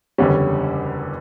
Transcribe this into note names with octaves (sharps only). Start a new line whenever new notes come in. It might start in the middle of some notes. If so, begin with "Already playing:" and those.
F#1 E2 D3 G3 C#4